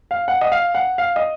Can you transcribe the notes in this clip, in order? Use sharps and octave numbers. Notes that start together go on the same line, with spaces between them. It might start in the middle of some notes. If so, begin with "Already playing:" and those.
F5
F#5
D#5
F5
F#5
F5
D#5